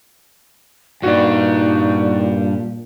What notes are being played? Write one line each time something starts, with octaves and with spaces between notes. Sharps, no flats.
G2 A#2 D#4 F#4 D5